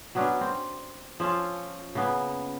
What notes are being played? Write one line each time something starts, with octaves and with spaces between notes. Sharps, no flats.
F#3 B3 C#4 D4
C4
F3 C#4 F4 A4
C#3 A#3 B3